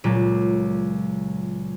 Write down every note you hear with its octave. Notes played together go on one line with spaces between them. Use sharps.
C#2 A#2 F#3